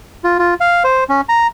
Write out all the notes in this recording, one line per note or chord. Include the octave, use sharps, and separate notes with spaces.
F4
F4
F5
C5
C#4
A#5